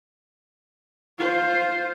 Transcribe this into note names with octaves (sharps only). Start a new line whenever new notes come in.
F4 C5